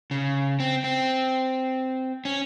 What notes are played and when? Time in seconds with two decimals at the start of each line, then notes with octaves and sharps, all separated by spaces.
0.11 C#3
0.60 C4
0.84 C4
2.25 C#4